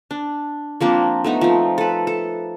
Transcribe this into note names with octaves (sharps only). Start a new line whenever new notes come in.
D4
F3 A#3 C4 D4
A3 B3 D#4
F3 C4
A4 B4
A4